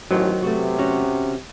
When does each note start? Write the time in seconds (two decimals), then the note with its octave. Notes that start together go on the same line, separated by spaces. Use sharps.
0.11 A1 D#3 F#3 C5
0.42 C3 A3 B3 F#4
0.78 C#4 F#4 F#5